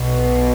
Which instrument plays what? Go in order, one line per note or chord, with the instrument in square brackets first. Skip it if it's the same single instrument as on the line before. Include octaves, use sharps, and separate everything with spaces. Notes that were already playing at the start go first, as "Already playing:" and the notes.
Already playing: [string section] B1 B2